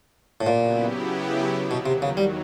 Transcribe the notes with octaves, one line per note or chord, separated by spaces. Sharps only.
A2
A#2 C#3 F#3 B3 E4 G4
D#2 B2 D#3 F#3
C3
C#3
G3